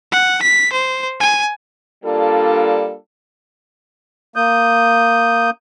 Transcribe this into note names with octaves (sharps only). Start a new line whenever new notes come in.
F#5
B6
C5
G#5
G3 A#3 D4 F4 A4
A#3 D#6 G6